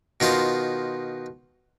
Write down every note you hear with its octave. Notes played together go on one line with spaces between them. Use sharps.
B2 D#3 F4 C5